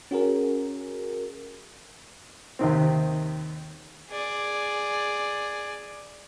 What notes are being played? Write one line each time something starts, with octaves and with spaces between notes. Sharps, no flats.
C#4 F#4 G#4 A#4
D#2 C3 D#3 C4
G#4 D5